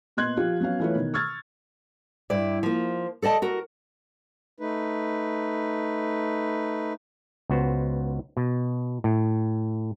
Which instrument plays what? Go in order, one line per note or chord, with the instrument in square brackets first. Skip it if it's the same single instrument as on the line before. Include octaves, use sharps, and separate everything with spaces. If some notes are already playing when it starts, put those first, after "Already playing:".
[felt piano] A#2 B3 D#5 C6 F#6 G#6
F3 F4 G4
F#3 B3 C#4 F5
E3 A3 E4 F4 B4 C#5
B2 D#3
C#6 E6 F6 G#6 A6
[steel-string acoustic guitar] G2 E4 D5
F3 A#3
A4 D5 D#5 A5
F#4 A#4
[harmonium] A3 D#4 B4
[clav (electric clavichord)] C#2 B3 F#4 C5
B2
A2